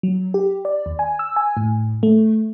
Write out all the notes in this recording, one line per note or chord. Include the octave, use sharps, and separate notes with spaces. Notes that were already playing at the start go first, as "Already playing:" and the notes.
F#3
G4
D5
D#2
G#5
E6
G#5
A2
A3